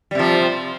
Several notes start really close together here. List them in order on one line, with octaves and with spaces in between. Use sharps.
G3 C3 F3